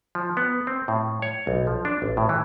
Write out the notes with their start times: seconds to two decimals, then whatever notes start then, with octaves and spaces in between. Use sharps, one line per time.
0.15 F3
0.37 B3
0.67 C4
0.88 A2
1.22 C#5
1.47 B1
1.67 F3
1.85 D4
2.02 A1
2.17 A2
2.29 E3